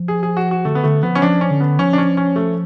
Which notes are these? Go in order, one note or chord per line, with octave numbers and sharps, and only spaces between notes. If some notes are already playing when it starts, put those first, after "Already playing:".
Already playing: F3
G#4
G#4
F#4
F#4
D3 A3
B3
D3 A3
F3 B3
C#4
F3 D4
C#4
D3
B3
F3 C#4
D4
C#4
C#4
A3